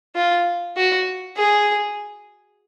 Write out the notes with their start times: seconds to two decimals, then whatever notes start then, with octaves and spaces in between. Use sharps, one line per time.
0.15 F4
0.76 F#4
1.37 G#4